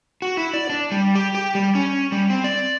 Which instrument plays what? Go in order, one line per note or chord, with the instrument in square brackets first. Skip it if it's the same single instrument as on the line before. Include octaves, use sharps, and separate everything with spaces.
[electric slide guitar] F#4
E4
D5
D4
G3
G4
G4
G3
C#4
G3
C4
D5